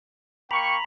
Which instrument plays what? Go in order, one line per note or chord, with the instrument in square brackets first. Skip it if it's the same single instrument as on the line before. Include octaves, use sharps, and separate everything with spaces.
[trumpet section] A#3 G5 C#6 [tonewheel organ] A#5 B5